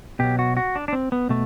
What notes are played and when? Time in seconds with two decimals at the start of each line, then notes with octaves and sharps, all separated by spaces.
0.19 B2 F#3 G4
0.39 F#4
0.57 F#4
0.75 D4
0.88 D4
0.93 C4
1.12 B3
1.29 B2 A3